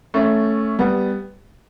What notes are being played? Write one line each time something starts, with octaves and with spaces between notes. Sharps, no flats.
A3 C#4
G3 B3